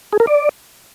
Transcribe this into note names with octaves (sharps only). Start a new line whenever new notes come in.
G#4
A#4
D5